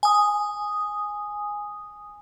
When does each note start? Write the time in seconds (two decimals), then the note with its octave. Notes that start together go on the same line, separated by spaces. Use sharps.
0.03 G#5 D#6